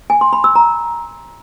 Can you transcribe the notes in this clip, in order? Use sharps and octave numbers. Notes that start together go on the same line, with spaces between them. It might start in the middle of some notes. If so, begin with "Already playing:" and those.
G#5
C6
B5
E6
A#5